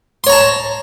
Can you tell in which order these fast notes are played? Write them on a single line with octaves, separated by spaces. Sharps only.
C6 C#5 A#5 A5